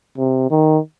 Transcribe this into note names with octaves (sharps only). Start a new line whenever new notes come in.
C3
D#3